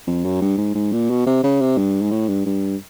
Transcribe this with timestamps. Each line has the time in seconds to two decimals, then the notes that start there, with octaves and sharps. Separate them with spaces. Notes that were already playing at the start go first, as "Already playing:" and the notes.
0.07 F2
0.25 F#2
0.41 G2
0.58 G#2
0.75 G#2
0.92 A#2
1.10 B2
1.27 C3
1.44 C#3
1.61 C3
1.77 G2
2.02 G#2
2.11 A2
2.28 G2
2.46 G2